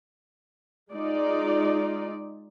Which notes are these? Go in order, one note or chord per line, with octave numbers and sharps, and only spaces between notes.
G#3 D#4 F4 D5